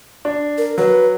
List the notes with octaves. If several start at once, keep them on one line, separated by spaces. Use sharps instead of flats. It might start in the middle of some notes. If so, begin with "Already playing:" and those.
D4
A#4
F#3 B4